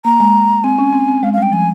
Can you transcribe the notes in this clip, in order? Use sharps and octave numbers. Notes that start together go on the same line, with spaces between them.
A#3 A#5
G#3
C4 G#5
C#4
C4
C4
G#3 F5
G3 F5
G5
F3 G#5